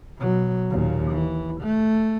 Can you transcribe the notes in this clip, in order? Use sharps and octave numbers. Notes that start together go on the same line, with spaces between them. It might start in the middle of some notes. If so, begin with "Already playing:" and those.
B2 F#3
D#2 A#2
E3
A3